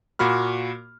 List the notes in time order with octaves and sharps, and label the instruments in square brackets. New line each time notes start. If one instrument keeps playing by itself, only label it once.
[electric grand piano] A#2 A#3 F#4 B5 F6